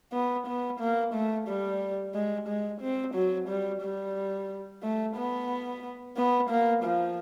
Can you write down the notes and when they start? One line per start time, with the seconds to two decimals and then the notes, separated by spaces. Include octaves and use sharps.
0.13 B3
0.47 B3
0.80 A#3
1.14 A3
1.48 G3
2.14 G#3
2.48 G#3
2.81 C4
3.14 F#3
3.48 G3
3.82 G3
4.82 A3
5.16 B3
6.17 B3
6.50 A#3
6.84 F3